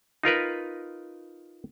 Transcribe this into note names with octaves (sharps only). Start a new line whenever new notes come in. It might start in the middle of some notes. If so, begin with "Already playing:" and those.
D#4 F4 A#4 B4